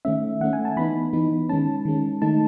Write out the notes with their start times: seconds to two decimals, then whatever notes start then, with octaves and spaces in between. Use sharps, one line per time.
0.05 D#3 A3 C#4 E5
0.41 D#3 A3 C#4 F#5
0.53 G#5
0.65 A5
0.76 E3 B3 D#4 B5
1.13 E3 B3 D#4
1.49 D#3 G#3 C#4 A5
1.85 D#3 G#3 C#4
2.22 D#3 A3 D#4 A5